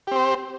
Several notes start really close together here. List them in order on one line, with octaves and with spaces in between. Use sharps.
G4 C4 C5